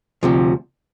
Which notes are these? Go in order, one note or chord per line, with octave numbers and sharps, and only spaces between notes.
D2 C3 F3